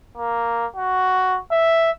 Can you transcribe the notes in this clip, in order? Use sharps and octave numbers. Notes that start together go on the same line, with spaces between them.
A#3
F#4
E5